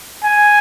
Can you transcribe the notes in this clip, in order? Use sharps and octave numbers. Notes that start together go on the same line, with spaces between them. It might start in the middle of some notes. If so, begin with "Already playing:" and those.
G#5